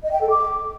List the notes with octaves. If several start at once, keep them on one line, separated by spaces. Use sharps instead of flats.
D#5
G5
A4
D6